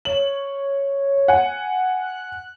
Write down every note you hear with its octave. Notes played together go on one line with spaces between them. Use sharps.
C#5 F#7
F#5 G#5
F#6